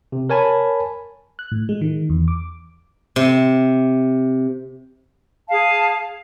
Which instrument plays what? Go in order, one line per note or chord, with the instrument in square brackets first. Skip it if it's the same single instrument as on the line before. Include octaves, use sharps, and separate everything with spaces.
[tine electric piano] C3
A#4 C#5 G#5 A5 B5
[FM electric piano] F#6
A2
G#3
D#3
E2
D6
[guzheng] C3
[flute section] G#4 F5 A5